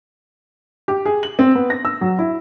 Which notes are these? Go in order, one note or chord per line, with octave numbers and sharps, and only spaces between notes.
G4
G#4
F#7
C4
B3
A#6
E6
F#3
E4